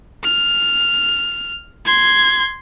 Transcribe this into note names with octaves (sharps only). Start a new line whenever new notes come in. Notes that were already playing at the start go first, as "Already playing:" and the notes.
F6
C6 G#6